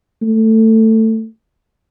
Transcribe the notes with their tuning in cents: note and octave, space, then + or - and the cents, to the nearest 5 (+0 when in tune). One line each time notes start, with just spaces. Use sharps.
A3 +15